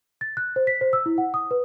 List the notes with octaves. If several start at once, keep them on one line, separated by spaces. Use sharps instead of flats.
A6
F#6
C5
B6
C5
E6
E4
F#5
D#6
B4